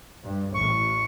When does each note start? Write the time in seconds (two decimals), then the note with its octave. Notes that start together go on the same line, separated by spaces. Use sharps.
0.23 G2
0.54 A1 A2 C#6